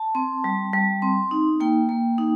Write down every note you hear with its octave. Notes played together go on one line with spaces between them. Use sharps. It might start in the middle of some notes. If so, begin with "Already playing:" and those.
Already playing: A5
C4
G3
G3
C4
D#4
A#3 G5
A#3
D#4